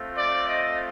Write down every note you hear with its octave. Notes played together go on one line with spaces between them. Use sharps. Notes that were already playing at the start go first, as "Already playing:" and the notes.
Already playing: A3 C4 F4
D5
D#5